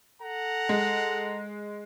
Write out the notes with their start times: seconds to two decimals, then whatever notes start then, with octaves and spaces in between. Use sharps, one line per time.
0.22 A4 F#5 A#5
0.69 G#3